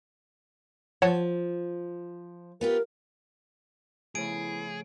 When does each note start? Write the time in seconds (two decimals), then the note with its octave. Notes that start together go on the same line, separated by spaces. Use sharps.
1.02 F3 C#5 F#5 A5
2.61 B3 F4 G4 A#4
4.15 C#3 F3 A3 B3 E4 G#4 D7